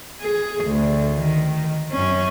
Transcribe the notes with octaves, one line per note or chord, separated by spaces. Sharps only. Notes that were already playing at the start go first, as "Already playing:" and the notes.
G#4
D2
D#3
F#2 C#4